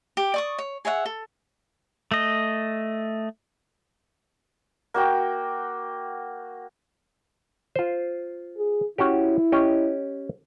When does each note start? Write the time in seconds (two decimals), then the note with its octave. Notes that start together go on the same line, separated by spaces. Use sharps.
0.17 G4
0.34 D5 C#6 D#6
0.58 C#5
0.85 G#4 C#5 E5 F#5
1.05 A4
2.12 A3 D#5
4.94 A#3 F#4 G5
7.76 F4 C5
8.58 G#4
8.98 C#4 E4 F#4 G4
9.52 C#4 G4 D#5